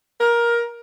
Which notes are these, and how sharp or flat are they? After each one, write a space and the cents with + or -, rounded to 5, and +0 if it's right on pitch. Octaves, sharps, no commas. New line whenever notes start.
A#4 +15